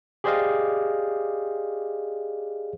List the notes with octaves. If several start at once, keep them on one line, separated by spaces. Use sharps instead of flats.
G4 G#4 C5 D5 D#5 F5